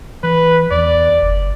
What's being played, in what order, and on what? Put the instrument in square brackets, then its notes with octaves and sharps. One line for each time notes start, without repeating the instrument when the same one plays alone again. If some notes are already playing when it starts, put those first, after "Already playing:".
[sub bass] E3 [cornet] B4
[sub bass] E2 [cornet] D5
[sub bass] F#1